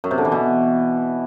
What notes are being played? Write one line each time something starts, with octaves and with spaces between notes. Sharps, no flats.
F#2
C3
D3
E3
B2